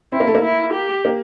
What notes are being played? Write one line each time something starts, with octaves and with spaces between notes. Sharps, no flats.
C4 E4
A#3
A3
A#3
E4
G4
A#3